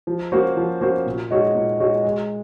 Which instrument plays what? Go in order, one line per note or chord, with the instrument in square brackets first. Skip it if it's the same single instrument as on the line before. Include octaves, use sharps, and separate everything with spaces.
[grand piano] F3
A#3 C#4 F#4 C5
F3
A#3 C#4 F#4 C5
A#2
G#3 D#4 F#4 C#5
A#2
G#3 D#4 F#4 C#5
G#3